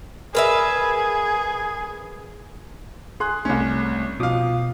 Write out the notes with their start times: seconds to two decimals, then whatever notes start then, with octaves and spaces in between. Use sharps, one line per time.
0.35 G#4 A#4 B4 E5
3.20 G#4 C6 F#6
3.45 C2 A3 C#4
4.20 B2 F3 F5 D6 D#6